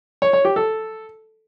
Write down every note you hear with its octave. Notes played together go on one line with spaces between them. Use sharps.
C#5
C#5
G4
A4